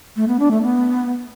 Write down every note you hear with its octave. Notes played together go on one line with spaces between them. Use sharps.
A3
B3
D4
A3
B3